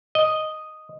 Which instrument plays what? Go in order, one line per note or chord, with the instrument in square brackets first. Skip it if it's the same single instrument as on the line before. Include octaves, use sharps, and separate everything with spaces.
[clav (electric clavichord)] D#5